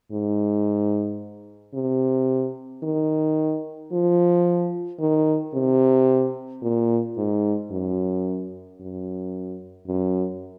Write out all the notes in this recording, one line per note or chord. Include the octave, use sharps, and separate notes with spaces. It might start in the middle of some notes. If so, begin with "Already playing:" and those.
G#2
C3
D#3
F3
D#3
C3
A#2
G#2
F#2
F#2
F#2